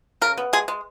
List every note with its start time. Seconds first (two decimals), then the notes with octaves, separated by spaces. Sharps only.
0.21 C#3 A#4
0.38 B3
0.53 G#3 G#4
0.68 G#3